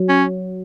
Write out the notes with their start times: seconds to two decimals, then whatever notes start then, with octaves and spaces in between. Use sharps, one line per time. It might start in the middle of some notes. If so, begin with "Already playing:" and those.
Already playing: F#3
0.09 C#4